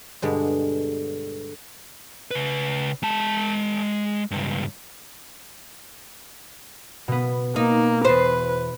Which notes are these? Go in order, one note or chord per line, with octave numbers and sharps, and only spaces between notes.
G2 B2 D3 G#3
C#3 B4
G#3 A5
C#2 G2
B2 B3
A#3 D#4
E2 B4 C5